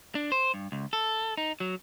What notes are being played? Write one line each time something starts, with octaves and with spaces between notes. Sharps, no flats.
D4
C5
G2
C#2
A4
D#4
F#3